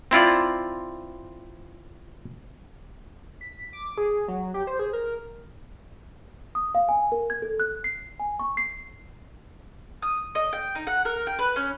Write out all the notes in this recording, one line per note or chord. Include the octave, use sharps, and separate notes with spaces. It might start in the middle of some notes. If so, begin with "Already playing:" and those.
C4 E4 F4 D5
B6
D6
G#4
F#3
G4
C5
G#4
A#4
D#6
F5
G#5
A#4
G#6
A4
F#6
C7
G#5
C#6
C7
D#6
D#5
G5
D#4
F#5
A#4
G5
B4
C#4